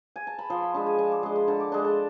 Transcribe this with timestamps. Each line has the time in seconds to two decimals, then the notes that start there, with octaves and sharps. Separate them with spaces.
0.16 G#5
0.27 A5
0.38 B5
0.50 F3 C6
0.62 B5
0.74 G#3 D4 A5
0.86 G#5
0.99 F3 A5
1.11 D6
1.23 G#3 D4 C6
1.36 B5
1.48 D3 A5
1.60 D6
1.72 G#3 D4 C6
1.84 A5